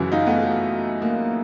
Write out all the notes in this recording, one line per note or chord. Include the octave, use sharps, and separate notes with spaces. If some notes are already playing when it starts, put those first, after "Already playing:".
Already playing: F#2 C#3 E3 E4 F#4
D#4 F4
A3 B3
A3
A#3